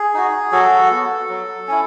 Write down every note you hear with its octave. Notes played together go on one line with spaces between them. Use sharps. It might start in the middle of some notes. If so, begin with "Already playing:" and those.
Already playing: G#4
D#4 F#4
F#3 F#4 A4
B3 F#4
F#3
C#4 E4